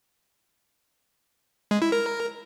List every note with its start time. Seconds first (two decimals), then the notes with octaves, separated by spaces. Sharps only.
1.71 G#3
1.82 E4
1.92 A#4